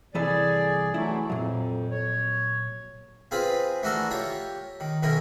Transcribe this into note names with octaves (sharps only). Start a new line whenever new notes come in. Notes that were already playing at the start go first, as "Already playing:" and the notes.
C2 E3 G#4 A4 D5
E3 F#3 A3 E4
F2 A#2 F#3
C#5
C4 F4 G#4 B4 B5
E3 A3 D4 F#4 A4 A#4
F4 G4 C#5
D#3
B1 D#3 C#4 E4 A#4